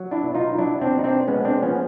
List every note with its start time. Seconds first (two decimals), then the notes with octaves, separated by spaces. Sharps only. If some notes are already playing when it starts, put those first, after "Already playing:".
Already playing: F#3
0.11 D4 E4
0.23 B2
0.35 D#4 F4
0.58 F#3 D4 E4
0.81 C4 D4
0.93 B2
0.99 D#4
1.04 C4 D4
1.28 G#3 B3 C#4
1.45 C4 D4
1.62 F3 B3 C#4